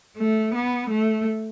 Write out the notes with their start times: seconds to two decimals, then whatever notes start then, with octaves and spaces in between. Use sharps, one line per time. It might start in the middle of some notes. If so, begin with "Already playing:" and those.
0.17 A3
0.54 B3
0.90 A3